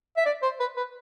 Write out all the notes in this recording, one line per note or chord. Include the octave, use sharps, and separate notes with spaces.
E5
D5
C5
B4
B4